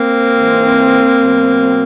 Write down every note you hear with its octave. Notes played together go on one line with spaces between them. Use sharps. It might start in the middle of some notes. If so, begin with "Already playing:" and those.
Already playing: A#3 C4
G#2 E3 G#3
B2 F#3